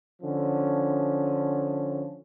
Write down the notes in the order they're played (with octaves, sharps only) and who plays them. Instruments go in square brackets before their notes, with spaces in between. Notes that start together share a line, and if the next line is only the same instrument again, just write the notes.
[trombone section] D3 F3 C#4